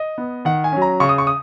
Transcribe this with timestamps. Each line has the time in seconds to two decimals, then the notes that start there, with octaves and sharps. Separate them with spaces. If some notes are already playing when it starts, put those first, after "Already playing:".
Already playing: D#5
0.18 B3
0.45 D#3 F#5
0.64 G#5
0.72 F#3 C#4
0.82 A#5
1.00 C#3 C#6
1.09 D#6
1.18 C#6
1.27 D#6